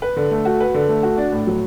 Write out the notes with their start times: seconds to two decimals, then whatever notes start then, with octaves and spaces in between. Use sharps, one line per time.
0.02 B4
0.16 D3
0.31 A3
0.45 F#4
0.60 B4
0.74 D3
0.89 A3
1.03 F#4
1.17 D4
1.32 A2
1.47 F#3